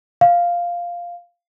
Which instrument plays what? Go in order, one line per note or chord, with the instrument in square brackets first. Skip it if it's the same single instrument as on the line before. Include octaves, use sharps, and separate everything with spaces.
[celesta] F5